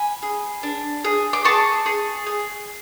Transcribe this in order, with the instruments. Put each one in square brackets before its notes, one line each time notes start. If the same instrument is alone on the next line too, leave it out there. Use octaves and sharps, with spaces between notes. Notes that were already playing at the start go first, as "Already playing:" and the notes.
Already playing: [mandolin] G#5 B5
G#4
D4
G#4
D6
G#4 A5 C#6
G#4
G#4